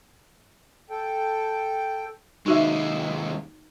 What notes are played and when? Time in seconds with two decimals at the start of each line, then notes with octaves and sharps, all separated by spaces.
0.90 A4 G5
2.46 D#2 G#3 D#4 F#4 E5